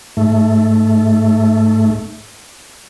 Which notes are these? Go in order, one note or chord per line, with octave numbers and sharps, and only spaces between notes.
G#2 A3